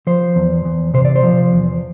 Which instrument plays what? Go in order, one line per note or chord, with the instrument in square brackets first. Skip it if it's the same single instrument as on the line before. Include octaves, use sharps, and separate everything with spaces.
[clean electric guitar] F3 C5
E2
E2
C3 C5
D5
C5
F3
E2